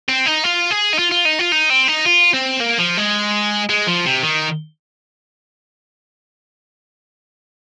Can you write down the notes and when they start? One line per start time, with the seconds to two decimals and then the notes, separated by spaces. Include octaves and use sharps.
0.09 C4
0.26 D#4
0.44 F4
0.71 G#4
0.93 D#4
0.99 F4
1.12 F4
1.25 D#4
1.39 F4
1.52 D#4
1.70 C4
1.88 D#4
2.06 F4
2.34 C4
2.61 A#3
2.79 F3
2.98 G#3
3.69 G#3
3.87 F3
4.06 C3
4.23 D#3